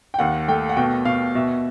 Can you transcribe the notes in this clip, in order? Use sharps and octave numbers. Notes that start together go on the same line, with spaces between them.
G5
D#2 F#5
A3 G5
F#5
B2 G5
B2 F5
B2 E5